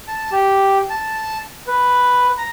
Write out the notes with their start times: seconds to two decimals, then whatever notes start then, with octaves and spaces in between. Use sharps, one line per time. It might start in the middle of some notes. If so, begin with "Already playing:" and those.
0.08 A5
0.32 G4
0.90 A5
1.67 B4
2.38 A#5